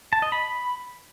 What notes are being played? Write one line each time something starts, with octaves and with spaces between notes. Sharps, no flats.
A5
D#5
B5